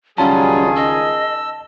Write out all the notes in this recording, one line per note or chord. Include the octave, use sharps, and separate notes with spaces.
C#2 D#3 F#3 G3 C#4 F4 G#4 A5
D#5 E6